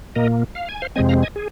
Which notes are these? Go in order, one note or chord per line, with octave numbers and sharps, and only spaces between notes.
A#2 A#3 A#4 D#5
F5
G#5
C5 F5
F2 C3 G#3 C4 D#5 G#5
F5 A#5
D#5 G#5
G#4